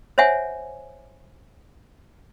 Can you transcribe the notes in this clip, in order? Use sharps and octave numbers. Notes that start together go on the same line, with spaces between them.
C5 C#5 E5 F#5 G#5